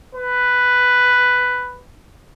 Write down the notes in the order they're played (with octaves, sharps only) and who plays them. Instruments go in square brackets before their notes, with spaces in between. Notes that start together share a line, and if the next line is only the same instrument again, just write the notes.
[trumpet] B4